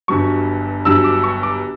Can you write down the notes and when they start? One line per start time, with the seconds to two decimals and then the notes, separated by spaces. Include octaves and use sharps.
0.08 G1 G2 F#3 C#6
0.85 G1 G2 F#3 E6
1.04 D6
1.23 C#6
1.43 D6